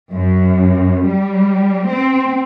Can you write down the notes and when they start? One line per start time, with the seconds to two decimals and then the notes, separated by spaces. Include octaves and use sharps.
0.12 F#2
1.08 G3
1.90 C4